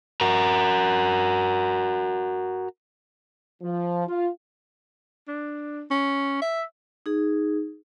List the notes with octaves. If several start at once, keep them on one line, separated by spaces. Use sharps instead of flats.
F#4 A#4
F3
F4
D4
C#4
E5
D#4 G#4